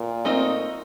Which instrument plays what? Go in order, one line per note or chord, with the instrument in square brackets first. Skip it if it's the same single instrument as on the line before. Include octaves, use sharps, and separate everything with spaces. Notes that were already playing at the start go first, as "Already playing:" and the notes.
Already playing: [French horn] A#2
[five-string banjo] A3 C4 D#4 A#4 D#5